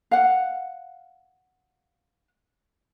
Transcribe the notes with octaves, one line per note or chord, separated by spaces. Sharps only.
F5 F#5